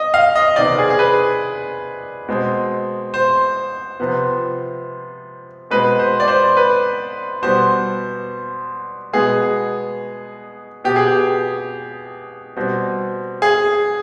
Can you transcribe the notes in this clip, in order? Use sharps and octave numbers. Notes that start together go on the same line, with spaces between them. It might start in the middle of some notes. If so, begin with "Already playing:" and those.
Already playing: D#5
F5
D#5
C3 D#3 B3 D5
G#4
G#4
B4
B2 G#3 C4
C5
C3 F3 B3
B2 G#3 C4 B4
C5
D5
C5
B4
B2 G3 B3 C5
B2 G#3 B3 G#4
B2 B3 G4
G#4
G4
B2 G3 C4
G#4